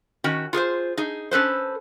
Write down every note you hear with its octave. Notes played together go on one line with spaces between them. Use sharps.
D#3 C#4 F#4 G5
F4 G#4 A4 C5
D#4 G#4
C#4 A4 B4 C5